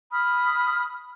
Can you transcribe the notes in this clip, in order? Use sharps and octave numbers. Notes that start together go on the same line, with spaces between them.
B5 D#6 F6